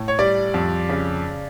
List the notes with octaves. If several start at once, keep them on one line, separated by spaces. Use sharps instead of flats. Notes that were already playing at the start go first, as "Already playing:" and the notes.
Already playing: A2
C#5
G3 D5
F2
C#3